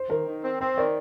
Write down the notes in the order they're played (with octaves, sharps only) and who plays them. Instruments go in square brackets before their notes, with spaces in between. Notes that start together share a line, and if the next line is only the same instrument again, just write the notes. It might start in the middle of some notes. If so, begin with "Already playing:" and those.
Already playing: [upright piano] C5
[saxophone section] D#3 [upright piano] A#4
[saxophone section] D#3
C4
[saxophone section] C4 [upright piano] C5
[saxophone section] D#3 [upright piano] D5